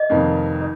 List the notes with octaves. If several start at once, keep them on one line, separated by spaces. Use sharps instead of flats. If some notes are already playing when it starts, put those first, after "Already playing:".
Already playing: D#5
F1 F2 D#3 A#3
D#4